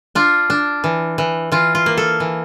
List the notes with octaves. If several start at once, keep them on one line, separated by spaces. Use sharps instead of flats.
D4 F4
D4
E3
E3
E3 F4
F4
A#3
A4
E3